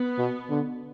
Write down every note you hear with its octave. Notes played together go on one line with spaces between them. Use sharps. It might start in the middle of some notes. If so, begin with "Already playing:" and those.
Already playing: B3
B2
D3